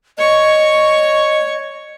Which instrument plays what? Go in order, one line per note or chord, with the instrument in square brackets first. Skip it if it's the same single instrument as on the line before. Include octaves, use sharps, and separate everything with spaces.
[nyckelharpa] C#5 C#6 [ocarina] D#5